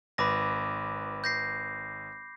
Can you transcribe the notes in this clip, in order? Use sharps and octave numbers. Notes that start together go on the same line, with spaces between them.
G#1 B4 B5 D6 A#6
G6 A#6 C7